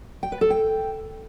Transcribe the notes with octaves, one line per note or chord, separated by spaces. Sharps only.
G5
B4
A4
G5